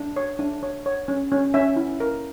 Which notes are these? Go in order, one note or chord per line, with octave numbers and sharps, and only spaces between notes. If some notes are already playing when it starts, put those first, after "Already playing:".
Already playing: D4
C#5
D4
C#5
C#5
C#4
C#4
C#4 E5
E4
A#4